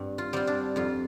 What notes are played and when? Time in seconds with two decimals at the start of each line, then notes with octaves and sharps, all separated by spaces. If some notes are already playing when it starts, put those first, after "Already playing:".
Already playing: G2 C4
0.18 F4
0.33 G3 C4 F4
0.47 D4
0.76 F2 F4